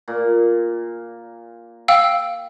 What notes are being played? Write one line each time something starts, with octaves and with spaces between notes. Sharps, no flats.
A#2
F5 G5 E6